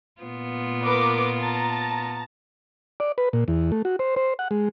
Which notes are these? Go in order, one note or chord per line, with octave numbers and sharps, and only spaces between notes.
A#2 B3 F4
A#4 B4 D6
A5 A#5
D5
B4
A#2
E2
A3
F#4
C5
C5
F#5
G#3